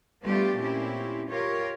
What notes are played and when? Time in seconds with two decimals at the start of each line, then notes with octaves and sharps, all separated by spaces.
0.24 G3 A3 B3 D4 F4 G4
0.58 A#2 C4 C#4 E4 G4
1.29 F4 G4 A#4 C#5